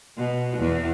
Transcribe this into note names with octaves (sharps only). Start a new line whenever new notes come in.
B2
E2